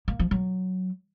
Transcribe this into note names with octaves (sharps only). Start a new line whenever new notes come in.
A#3
F3
F#3